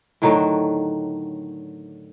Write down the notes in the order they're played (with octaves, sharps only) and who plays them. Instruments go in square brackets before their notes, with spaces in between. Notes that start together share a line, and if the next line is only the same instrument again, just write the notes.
[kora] A2 D3 D#3 F#3